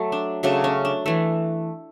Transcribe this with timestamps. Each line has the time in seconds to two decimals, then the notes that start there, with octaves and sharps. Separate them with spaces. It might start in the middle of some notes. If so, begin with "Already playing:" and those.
Already playing: F#3 A3
0.12 D4
0.43 C#3 F#3 A3 D4
0.64 C#4
0.85 D4
1.06 E3 A3